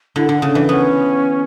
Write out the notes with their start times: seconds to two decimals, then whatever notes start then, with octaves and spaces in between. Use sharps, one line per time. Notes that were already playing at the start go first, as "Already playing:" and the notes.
0.16 D3 E4
0.29 D3
0.34 D4
0.42 C#3
0.51 E3 D4
0.68 B3 C#4